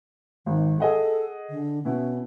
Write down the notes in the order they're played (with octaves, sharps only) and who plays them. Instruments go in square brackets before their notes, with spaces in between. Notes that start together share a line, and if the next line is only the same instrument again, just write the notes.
[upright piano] G#1 [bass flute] D#3
[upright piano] G#4 D#5 F#5 [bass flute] A4
[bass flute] D3
[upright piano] B2 E4 [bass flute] C#4